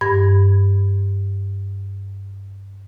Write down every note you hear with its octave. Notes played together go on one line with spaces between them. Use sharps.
G2 G#6